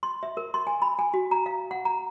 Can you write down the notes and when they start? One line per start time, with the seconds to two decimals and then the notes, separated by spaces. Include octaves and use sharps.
0.03 C6
0.23 E5
0.37 A#4
0.54 C6
0.67 G#5
0.82 B5
0.99 G#5
1.14 F#4
1.31 A#5
1.46 F5
1.71 F#5
1.85 A#5